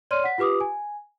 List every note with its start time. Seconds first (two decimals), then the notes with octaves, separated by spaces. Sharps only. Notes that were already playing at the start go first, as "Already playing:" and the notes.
0.11 C#5 D5 C6 F6 D#7
0.24 F#5 B6
0.38 F4 G4 B4 D6 D#6
0.60 G#5